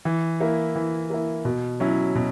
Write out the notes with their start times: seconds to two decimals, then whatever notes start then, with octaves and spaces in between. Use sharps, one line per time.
0.05 E3
0.41 A#3 E4
0.75 E3
1.10 A#3 E4
1.45 B2
1.80 F#3 C#4 E4
2.15 B2